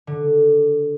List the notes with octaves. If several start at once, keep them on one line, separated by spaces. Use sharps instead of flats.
D3